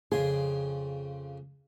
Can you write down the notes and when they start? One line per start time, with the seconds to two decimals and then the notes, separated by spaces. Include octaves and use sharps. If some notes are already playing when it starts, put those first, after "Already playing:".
0.12 F2 C#3 G#4 C6